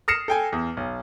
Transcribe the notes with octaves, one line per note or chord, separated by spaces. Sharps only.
D#6 F6 A#6 C7 C#7 E7
A4 G5 G#5
E2
B1